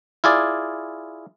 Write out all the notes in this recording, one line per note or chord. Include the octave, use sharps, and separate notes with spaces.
E4 F4 G#4 D5